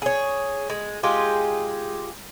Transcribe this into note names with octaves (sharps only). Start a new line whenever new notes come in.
G#4 C#5
G#3
G#3 F4 G4 G#4